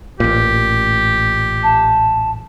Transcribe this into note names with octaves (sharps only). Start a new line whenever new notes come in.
A1 A#2 G4
A5